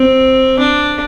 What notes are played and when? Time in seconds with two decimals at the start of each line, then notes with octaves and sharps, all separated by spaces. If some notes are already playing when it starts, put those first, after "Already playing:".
Already playing: C4
0.59 D4